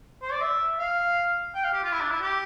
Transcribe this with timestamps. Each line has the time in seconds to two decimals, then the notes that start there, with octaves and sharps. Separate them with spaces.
0.22 C5
0.32 D5
0.41 E5
0.79 F5
1.54 G5
1.64 F5
1.73 G4
1.83 F4
1.92 E4
2.01 D4
2.11 E4
2.21 G4